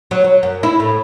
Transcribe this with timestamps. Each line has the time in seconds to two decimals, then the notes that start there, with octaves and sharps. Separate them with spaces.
0.11 F#3
0.24 F#3
0.43 F#2
0.63 E4
0.80 A2